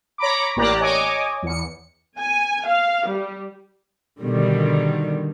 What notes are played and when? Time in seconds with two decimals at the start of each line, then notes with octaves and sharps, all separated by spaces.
0.18 C#5 A#5 B5 D6
0.56 A1 A#3 G4 D5 A#5 F#6
0.81 C#5 D#5 G#5 D6
1.42 E2 C#7
2.19 G#5
2.67 F5
3.08 G3
4.21 B2 D3 D#3 G3